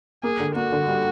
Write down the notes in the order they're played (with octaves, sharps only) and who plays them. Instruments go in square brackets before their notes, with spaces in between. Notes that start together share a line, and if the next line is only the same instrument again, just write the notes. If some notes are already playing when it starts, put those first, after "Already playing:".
[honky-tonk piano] A#3 [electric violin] G#4
[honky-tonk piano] D3
[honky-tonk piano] A#3 [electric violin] F#4
[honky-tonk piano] D3
G3